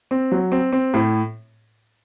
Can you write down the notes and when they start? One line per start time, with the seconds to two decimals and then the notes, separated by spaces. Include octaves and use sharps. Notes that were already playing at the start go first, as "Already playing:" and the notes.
0.11 C4
0.32 F#3
0.52 C4
0.73 C4
0.94 A2